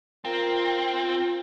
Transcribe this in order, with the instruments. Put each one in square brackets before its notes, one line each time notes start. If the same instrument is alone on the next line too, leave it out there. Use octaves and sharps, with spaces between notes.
[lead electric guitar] C4 [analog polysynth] F4 [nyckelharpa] A#4